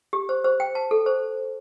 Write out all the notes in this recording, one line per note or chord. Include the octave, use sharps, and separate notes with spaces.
G4
C5
C5
G5
A5
A4
C5